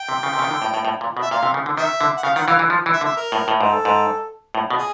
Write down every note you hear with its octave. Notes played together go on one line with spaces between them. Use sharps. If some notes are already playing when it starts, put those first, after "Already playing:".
Already playing: G5
C3
C#3
C3
C#3
D#3
D3
A2
A2
A2
A#2
B2
E5
A#2 F5
C3
C#3
D3
D#3 E5
D3
F#5
C#3 F5
D#3 F#5
E3 F5
E3
F3
E3
E5
D3
E5
A#4
A2
A2
G#2 A4
G#2
A2
B2
G#4